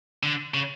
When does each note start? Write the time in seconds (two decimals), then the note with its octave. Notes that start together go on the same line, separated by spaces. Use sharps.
0.23 D3
0.54 C#3